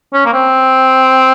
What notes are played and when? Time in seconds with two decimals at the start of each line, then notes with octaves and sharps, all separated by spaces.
0.13 C#4
0.25 A#3
0.33 C4